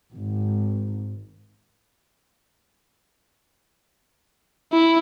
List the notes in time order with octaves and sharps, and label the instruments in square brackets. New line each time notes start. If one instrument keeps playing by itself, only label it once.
[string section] G#1
[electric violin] E4